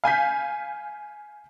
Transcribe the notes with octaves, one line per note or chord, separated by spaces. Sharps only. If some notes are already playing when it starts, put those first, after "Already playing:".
F5 G#5 G6 B6